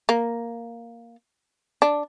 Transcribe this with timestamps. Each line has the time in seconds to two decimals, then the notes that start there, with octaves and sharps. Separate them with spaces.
0.09 A#3
1.82 D4